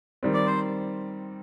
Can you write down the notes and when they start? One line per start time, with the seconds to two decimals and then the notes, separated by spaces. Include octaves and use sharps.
0.23 D#3 G3 C4
0.34 D5
0.47 C5